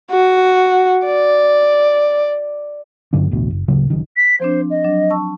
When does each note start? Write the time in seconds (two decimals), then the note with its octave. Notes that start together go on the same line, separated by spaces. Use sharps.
0.11 F#4
1.05 D5
3.13 G2 D3 F#3 C#4
3.31 A1 D2 B2
3.51 F#1
3.68 D1 C#3 F#3 A#3
3.90 F#1 F#2 D#3
4.16 B6
4.40 F3 C4 D4 C5
4.70 D#5
4.84 F#3 D4
5.10 A5 C#6 E6